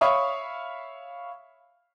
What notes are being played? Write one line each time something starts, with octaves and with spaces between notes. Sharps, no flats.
C#5 E5 F5 B5 C#6 D#6